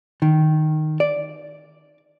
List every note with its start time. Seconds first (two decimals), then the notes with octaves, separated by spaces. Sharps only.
0.22 D#3
1.00 D5